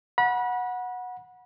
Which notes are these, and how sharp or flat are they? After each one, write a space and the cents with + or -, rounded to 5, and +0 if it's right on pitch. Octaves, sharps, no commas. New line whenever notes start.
F#5 -15 B5 -35